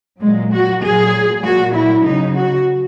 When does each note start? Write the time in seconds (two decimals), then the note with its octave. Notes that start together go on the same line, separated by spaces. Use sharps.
0.21 A#2 F#3 G#3
0.52 F#4
0.82 A#2 F#3 G#4
1.43 A#2 F#3 F#4
1.75 E4
2.05 C#3 F#3 D#4
2.35 F#4